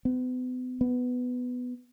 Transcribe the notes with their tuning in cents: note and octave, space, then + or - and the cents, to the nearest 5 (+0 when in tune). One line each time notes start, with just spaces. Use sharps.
B3 +40
B3 +10